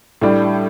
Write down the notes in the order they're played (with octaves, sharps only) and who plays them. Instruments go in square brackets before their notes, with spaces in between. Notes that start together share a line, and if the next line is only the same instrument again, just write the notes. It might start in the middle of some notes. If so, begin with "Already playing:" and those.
[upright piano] A2 G3 D4